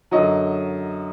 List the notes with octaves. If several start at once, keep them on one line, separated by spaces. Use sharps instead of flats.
F#2 D3 F#3 D#5